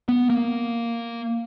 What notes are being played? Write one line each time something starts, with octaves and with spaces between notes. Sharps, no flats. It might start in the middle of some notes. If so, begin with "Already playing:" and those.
B3
A#3